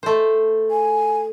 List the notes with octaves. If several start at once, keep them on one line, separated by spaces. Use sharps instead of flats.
A3 C5
G#5